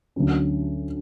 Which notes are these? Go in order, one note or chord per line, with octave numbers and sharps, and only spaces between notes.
D2 D3 F#3 C#4